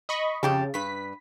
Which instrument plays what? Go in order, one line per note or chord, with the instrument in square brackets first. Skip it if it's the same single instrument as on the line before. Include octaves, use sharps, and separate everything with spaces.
[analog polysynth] D#5 B5 C#6
[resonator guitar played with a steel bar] F2 G4 A5 [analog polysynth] C#3
[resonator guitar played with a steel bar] G2 B4 [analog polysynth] B6